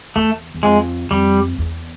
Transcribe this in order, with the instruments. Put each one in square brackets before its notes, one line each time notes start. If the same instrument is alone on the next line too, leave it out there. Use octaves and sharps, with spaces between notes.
[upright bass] E2 [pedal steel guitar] A3
[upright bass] E2
[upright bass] F2 [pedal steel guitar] G#3
[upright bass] F2 [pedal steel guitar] G3
[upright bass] E2